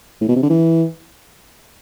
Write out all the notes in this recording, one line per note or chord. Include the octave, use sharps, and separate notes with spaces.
A2
B2
C3
D3
E3